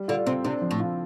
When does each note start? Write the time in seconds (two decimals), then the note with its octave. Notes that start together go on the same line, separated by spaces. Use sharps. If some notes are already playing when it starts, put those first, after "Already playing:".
Already playing: G3
0.08 D3 F4
0.26 C3 C4
0.44 C3 D4
0.62 F3
0.71 A2
0.80 F4